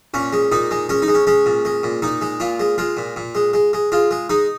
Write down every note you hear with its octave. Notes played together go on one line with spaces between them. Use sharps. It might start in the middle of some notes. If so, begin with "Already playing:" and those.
A#2 C#4
G#3
A#2 D#4
G#3
G#3 C#4
D#4
G#3
C#4
G#3 C#4
A#2
G#3
A#2
A#2 D#4
G#3
A#2 F4
G#3
G#3 F4
A#2
A#2
G#3
G#3
G#3
G#3 F4
G#3
G#3 D#4